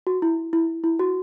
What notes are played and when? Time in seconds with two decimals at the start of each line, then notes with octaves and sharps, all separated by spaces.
0.07 F#4
0.22 E4
0.53 E4
0.84 E4
0.99 F#4